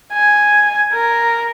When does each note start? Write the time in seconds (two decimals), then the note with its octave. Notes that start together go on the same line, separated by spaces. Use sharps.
0.13 G#5
0.93 A#4